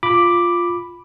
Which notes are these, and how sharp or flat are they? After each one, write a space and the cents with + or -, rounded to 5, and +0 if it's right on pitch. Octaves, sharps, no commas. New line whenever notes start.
F4 +0 B5 +0 D6 +0